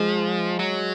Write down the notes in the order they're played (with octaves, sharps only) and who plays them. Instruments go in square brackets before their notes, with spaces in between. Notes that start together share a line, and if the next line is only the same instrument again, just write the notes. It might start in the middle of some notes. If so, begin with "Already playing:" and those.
Already playing: [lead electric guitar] F3 [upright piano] G#3
[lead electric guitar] F#3